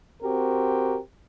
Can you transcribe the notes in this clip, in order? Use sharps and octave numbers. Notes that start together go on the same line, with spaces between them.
C4 F#4 G4 A#4